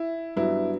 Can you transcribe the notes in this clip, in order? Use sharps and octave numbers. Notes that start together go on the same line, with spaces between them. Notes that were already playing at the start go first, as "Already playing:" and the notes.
Already playing: E4
G2 F#3 B3 E4